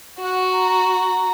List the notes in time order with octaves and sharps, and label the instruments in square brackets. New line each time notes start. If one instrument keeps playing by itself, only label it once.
[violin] F#4 [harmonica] F#5
[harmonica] A#5
A#5